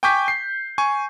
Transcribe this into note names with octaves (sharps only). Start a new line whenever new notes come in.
G5 G#5 C#6 D6 G6 B6
C7
G#5 C#6